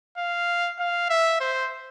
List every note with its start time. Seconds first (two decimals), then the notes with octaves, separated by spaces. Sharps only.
0.18 F5
0.79 F5
1.10 E5
1.40 C5